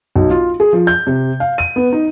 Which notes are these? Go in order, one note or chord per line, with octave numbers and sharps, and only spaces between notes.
B1
F4
G#4
F3
G6
C3
F5
D#7
B3
D#4